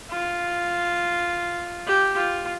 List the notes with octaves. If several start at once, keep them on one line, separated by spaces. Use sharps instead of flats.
F4
G4
F4